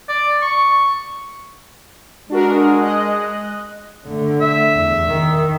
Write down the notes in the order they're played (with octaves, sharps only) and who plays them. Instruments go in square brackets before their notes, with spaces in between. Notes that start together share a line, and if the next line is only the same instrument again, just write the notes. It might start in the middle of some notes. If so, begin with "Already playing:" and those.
[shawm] D5
C#6
[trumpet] G#3 [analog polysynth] D4 F#4 A#4
[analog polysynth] D#5 F#6
[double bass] D3 A3
[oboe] E5
[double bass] E2
D#3